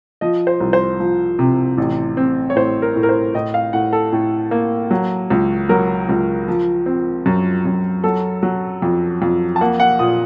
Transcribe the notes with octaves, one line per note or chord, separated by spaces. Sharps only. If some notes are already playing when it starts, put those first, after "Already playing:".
F3 D#5
C5
C2
C5
F3
C3
A1
C4
C#5
A2 C5
A#4
A2
A#4
C5
A2 D#5
F5
A2 F#5
A4
A2
A#3
F#3
C#2
F#3 A#4
C#2
F3
C4
F#2
F#2
F#3 A4
F#3
F2
F2
A5
A#3 F#5
F#5
A#2 D#6